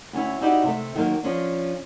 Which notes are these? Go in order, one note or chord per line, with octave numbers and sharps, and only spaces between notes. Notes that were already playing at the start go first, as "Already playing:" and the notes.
D2 C#4 E4
D#4 E4 F#4 G4 D5 D#5
C3 A3
D#3 F#3 A#3 C5 F5
F3 C#4 D4